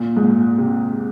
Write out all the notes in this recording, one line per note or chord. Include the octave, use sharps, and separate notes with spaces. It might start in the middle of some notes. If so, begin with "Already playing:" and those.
Already playing: A#2
G#2
A#2
C3